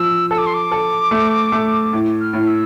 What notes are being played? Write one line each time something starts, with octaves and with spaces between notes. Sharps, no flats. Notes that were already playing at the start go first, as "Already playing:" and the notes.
Already playing: F3 E6
A4 E6
D6
C6
D6
A4
A3
A3
A2
F6
A2
E6